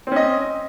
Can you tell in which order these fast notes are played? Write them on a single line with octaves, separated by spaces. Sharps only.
C4 C#4 D#5